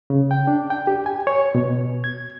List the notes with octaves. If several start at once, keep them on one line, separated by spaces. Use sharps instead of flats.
C#3
G5
D4
G5
G4
G#5
C#5
B2
G#6